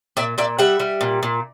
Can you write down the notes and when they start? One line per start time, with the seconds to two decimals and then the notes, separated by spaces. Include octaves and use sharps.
0.17 A#2 D5 E5
0.38 A#2 D5 E5
0.59 G3 E5 F#5
0.80 G3
1.01 A#2
1.23 A#2